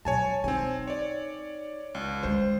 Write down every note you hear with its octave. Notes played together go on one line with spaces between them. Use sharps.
B2 F#3 C#5 G#5 A5
C4 D#4 G#5
C#5 D5
C#2
D3 G#3 C5